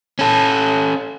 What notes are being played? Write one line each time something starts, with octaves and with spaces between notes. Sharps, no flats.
C#4 A4